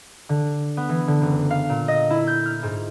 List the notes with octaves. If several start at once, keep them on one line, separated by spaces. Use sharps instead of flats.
D3
B3
E3
D3
F#1
F5
A#2
D#5
E4
G6
F6
G#2